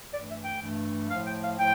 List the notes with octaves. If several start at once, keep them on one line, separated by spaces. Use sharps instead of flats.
G2 E3 A3 D5
E5
G5
G2 E3 A3
A2 F3 A3 F5
G5
F5
A2 F3 A3 G5